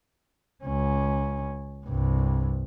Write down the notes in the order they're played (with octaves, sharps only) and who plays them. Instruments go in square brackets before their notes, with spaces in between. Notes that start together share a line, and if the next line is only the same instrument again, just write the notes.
[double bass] C#2 C#4
C2 G2